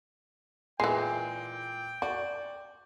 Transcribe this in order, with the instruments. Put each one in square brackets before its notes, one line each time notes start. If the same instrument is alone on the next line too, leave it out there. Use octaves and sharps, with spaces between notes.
[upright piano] A#2 C7 [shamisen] E3 G#3 [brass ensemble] G5
[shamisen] F#4 [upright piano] D5